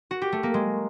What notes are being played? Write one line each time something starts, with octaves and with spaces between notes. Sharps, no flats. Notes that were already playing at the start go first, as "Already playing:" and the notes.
F#4
G4
A3
A#3
G#3